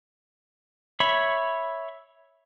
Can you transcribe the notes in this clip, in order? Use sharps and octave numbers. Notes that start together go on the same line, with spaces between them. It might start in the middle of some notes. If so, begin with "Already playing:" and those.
C#5 E5 B5 C#6